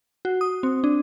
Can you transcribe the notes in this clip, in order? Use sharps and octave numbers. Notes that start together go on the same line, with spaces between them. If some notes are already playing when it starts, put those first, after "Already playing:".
F#4
D#6
C4
D4